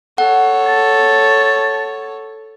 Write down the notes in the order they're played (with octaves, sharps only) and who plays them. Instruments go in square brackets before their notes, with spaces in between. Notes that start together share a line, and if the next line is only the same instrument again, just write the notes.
[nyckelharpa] A4 C#5 [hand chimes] F#5
[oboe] A5